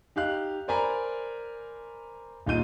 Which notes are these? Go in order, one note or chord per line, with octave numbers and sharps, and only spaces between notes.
D#4 G4 F5 F#6
A#4 C5 D5 G#5 A#5 B5
D#1 D#4 F4 G6 D#7